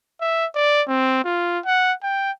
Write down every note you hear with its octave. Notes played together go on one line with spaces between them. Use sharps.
E5
D5
C4
F4
F#5
G5